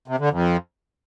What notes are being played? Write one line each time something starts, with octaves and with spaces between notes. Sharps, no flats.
C3
D3
F2